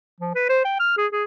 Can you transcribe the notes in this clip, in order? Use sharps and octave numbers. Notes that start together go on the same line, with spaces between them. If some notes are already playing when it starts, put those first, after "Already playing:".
F3
B4
C5
G5
F6
G#4
G#4